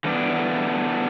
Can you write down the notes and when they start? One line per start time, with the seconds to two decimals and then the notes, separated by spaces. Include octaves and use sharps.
0.04 D3 E3 G3 B3 D4